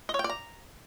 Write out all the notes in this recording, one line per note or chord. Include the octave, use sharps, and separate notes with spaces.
D#5
C#5
G5
D5
A#5